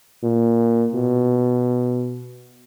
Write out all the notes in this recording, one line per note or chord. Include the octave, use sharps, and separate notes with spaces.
A#2
B2